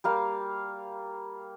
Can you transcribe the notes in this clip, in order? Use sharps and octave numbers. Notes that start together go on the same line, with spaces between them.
G3 A#3 F5